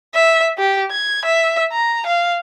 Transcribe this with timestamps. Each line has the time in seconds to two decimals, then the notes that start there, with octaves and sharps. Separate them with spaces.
0.15 E5
0.58 G4
0.91 G#6
1.25 E5
1.72 A#5
2.06 F5